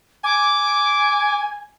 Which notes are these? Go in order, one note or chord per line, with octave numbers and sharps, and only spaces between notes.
G#5 D6